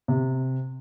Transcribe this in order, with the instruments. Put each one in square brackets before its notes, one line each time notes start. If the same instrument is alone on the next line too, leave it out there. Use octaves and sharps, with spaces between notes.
[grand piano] C3